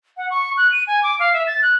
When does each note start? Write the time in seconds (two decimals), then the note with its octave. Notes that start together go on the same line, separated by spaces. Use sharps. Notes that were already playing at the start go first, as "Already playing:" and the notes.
0.17 F#5
0.30 C#6
0.57 F#6
0.72 D#7
0.87 G#5
1.03 D6
1.20 F5
1.33 E5
1.47 A6
1.62 F#6